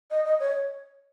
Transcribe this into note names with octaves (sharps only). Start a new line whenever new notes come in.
D#5
D#5
C#5